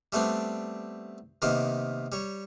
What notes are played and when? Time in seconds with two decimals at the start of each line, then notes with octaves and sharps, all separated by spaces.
0.12 G3 A3 B3 C4 D4
1.42 C3 D#3 A#3 B3
2.12 G3 C#5